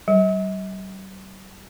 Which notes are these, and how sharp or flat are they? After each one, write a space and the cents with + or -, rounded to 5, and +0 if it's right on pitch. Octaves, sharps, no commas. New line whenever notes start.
G3 -40